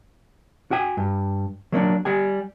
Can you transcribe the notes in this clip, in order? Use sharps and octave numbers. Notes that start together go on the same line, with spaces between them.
F#4 G5 G#5
G2
F#3 A#3 C4 D4
G3 G4 G#5